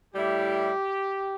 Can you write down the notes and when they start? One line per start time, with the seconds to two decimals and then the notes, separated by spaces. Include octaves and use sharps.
0.14 A2 G3 E4 G4